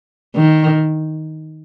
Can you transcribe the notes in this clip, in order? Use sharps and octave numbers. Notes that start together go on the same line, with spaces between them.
D#3